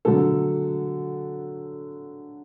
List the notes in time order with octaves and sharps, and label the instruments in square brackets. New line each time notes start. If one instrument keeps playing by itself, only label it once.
[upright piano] D3 F#3 A3 A4